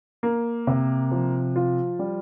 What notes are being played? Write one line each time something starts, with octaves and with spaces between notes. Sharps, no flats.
A#3
C3
F3
F4
G3